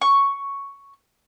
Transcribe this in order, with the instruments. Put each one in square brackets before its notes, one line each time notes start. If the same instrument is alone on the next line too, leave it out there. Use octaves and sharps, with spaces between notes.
[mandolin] C#6